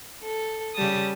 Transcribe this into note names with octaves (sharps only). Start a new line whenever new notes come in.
A4
C#3 G3 A5 D#6